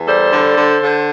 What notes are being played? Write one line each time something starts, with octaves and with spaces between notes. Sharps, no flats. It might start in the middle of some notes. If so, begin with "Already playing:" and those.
Already playing: E2
G3 A4 C5
D3
D3
D3